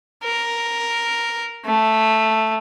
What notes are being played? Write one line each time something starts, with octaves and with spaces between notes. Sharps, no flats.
A#4
A3